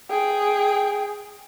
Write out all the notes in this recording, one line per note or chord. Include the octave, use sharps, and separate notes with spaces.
G#4 G5